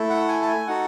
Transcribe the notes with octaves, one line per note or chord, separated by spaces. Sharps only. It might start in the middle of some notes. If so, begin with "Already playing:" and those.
Already playing: A3 E4 A4
F#5
G#5
A5
G#5
D#4 F#4 A4 F#5